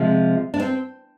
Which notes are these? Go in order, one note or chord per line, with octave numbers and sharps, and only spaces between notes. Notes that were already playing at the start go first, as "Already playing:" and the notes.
Already playing: C3 F3 G#3
D4
C4